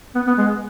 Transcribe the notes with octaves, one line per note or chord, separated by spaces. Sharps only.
B3
B3
G#3